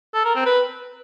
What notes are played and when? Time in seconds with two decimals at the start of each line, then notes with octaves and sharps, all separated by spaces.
0.14 A4
0.25 A#4
0.35 C4
0.46 B4